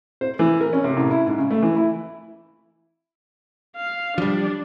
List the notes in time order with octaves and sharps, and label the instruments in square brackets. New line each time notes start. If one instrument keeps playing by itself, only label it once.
[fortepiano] C5
E3
A#4
C#4
C3
A1
E4
G#2
C#3
A3
E3
E4
[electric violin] F5
[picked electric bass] F3 G3 [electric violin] D4